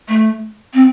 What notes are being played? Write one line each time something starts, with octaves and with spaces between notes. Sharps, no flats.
A3
C4